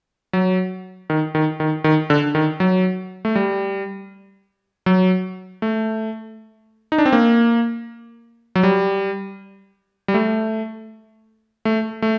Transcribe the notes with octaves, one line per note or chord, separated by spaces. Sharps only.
F#3
D#3
D#3
D#3
D#3
D3
D#3
F#3
A3
G3
F#3
A3
D#4
D4
C4
A#3
F#3
G3
G3
A3
A3
A3